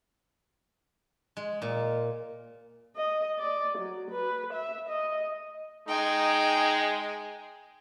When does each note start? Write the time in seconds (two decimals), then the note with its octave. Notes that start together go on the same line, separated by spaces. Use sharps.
1.37 G#3
1.62 A#2
2.96 D#5
3.39 D5
3.78 F#3
4.11 B4
4.53 E5
4.88 D#5
5.88 G#3 D#4 G5 G#5